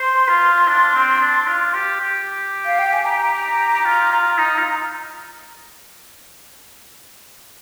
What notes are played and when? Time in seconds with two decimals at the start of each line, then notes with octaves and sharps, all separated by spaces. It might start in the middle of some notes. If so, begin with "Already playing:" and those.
Already playing: C5 C6
0.29 F4
0.68 D4
0.95 C4
1.21 D4
1.47 F4
1.74 G4
2.01 G4
2.66 F5
2.79 G5
2.93 G#5
3.05 A#5
3.74 G4
3.85 F4
4.12 F4
4.38 D#4
4.58 F4